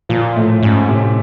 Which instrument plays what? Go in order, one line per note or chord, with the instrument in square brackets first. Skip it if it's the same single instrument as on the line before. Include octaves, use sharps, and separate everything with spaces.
[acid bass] A#2 [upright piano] F3
[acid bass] A2 [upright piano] A3
[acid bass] G#2 [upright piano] C#4
[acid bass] A2 [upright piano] C3